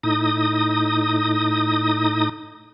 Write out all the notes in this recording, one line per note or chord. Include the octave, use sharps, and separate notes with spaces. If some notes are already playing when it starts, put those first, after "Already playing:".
A2 D#4 D#6